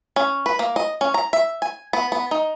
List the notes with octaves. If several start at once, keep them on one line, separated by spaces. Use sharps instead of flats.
C#4
B4
A#3
D#5
C#4
A#5
E5
G#5
B3
B3
D#4